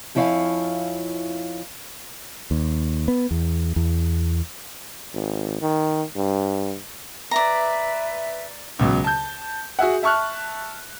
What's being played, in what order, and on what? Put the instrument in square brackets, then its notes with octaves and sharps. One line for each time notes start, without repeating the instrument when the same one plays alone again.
[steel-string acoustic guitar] F2 F3 E4 C#5 F5 G#5
[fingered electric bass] D#2
B3
E2
E2
[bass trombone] G#1
D#3
G2
[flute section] B4 E5 [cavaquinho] D5 A#5
[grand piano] C#2 B2 F#3
A5 G6
F#4 G#4 E5 F#5
E5 A5 C#6 F6 F#6